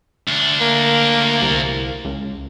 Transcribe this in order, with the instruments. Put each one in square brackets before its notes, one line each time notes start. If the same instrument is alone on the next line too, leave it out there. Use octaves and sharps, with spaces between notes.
[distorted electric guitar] D2 D4
[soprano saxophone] A#3
[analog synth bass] C2
C#2